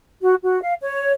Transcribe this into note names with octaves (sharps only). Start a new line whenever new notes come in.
F#4
F#4
F5
C#5